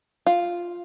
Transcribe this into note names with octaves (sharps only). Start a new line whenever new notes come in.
F4